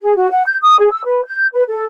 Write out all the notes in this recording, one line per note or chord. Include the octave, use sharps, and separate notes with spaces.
G#4
F#4
F#5
G6
D#6
G#4
E6
B4
G6
B4
A4